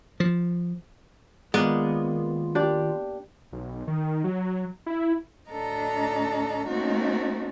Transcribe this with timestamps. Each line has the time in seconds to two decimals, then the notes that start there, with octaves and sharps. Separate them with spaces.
0.20 F3
1.54 D#3 G#3 A#3 B3 F4 B4 D5
2.55 D4 G4 D5
3.52 B1
3.87 D#3
4.24 F#3
4.86 E4
5.50 D2 A2 D4 A4 D#5 A#5
6.67 A3 A#3 C4 C#4 D#4 F#4